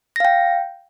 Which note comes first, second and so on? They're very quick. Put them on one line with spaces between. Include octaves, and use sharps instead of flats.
A#6 F5 G5